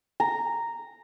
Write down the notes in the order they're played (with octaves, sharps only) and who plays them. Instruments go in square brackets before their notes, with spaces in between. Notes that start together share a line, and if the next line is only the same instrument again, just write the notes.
[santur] A#5